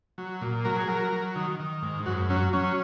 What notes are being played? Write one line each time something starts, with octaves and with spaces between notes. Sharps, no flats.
F#3
A#2
F#3 A#4
G#4
F#3 A#4
F#3
D#3
D#3
G#2
F#2 F#4
F#3 C#4
F#3 C#4